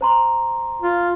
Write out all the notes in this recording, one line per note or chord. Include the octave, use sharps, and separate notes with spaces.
C5 A#5 C6
F4